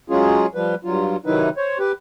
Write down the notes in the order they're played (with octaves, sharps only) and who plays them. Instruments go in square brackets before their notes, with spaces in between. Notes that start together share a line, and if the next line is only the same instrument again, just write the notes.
[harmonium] F#3 G#3 C#4 F4 G#4
F3 G3 B4
G2 F#3 F4
C3 D#3 F#3 D#4 E4 B4
C5 C#5
G4 B4